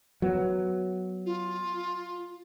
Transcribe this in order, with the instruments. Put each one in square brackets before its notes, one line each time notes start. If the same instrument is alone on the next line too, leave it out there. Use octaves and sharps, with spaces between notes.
[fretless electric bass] F#3 B3
[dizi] F4